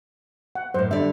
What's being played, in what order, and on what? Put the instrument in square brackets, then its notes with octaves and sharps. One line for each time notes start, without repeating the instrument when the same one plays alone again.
[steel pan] F#5
[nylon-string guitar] F#2 A2 [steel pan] C5
[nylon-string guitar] D3 G3 D5 [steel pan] E5